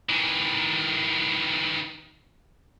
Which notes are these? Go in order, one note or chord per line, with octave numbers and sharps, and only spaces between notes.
D#3 E3